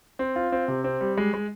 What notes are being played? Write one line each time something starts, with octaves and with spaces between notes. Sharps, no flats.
C4
F4
C4
C3
C4
G3
G#3
G#3